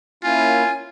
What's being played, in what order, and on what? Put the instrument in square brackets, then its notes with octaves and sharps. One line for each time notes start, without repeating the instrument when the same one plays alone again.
[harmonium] A#3 C#4 E4 [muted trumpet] F4 [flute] G#5